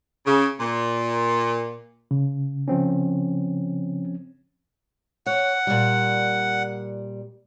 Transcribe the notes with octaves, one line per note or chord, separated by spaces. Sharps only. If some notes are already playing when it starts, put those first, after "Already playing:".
C#3
A#2
C#3
F3 C4 C#4
C#5 F#5
A#2 G3